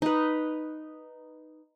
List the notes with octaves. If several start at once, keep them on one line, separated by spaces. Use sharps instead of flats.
D#4 B4